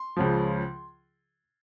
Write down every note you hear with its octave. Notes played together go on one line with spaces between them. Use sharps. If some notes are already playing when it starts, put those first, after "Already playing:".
Already playing: C6
C#2 C#3 F3